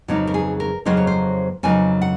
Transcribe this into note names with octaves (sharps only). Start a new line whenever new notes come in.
F2 C#3 F#3 A#3 D#4 F#4
A#4
G#4
A#4
F2 C#3 F#3 A#3 D#4 C5
C#5
C5
F2 C#3 F#3 A#3 D#4 G#5
F#5